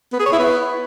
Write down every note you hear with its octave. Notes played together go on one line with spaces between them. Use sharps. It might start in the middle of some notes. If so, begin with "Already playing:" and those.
B3
G#4
C#5
E4
B3